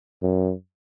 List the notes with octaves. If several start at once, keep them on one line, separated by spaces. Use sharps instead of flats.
F#2